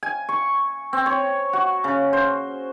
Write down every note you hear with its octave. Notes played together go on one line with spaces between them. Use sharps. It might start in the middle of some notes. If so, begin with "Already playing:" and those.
G#5
C#6
C4
C#5
F#4
C#3
C5